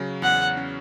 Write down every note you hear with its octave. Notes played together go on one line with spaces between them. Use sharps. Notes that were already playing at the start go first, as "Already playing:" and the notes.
Already playing: C#3 F#3
E2 F#5
C#4